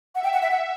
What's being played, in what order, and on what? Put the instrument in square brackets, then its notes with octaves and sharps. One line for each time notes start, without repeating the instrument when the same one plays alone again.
[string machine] E5 [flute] F#5
[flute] G5
F#5
E5
F#5